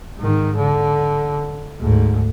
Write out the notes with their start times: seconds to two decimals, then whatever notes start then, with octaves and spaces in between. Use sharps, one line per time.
0.19 G#2 D#3
0.56 D3
1.81 D2 G#2